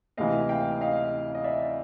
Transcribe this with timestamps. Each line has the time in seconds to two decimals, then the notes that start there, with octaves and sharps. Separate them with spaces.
0.17 D2 C3 E3 D#5 F5
0.49 F5 G5
0.81 D#5 F5
1.35 D#5
1.44 D5 E5